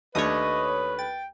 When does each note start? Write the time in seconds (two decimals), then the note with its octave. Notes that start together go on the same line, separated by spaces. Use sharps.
0.15 D#2 A3 D4 B4 C#5 D#5 D#6
0.99 G5 A6